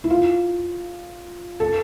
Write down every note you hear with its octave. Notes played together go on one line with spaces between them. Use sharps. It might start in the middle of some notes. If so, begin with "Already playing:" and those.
E4
F4
A4